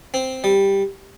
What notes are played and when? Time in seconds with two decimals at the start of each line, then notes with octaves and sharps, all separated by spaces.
0.14 C4
0.44 G3